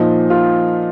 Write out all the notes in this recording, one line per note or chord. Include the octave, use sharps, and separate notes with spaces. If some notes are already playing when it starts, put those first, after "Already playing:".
Already playing: A#2 F3 D#4
F4